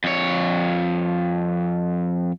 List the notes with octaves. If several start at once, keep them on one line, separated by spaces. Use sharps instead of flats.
F2 C#5